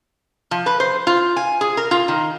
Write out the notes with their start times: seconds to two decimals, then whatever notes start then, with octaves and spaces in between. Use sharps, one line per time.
0.51 F3
0.66 B4
0.80 C5
1.07 F4
1.36 G#5
1.61 G#4
1.77 A#4
1.91 F4
2.08 D#3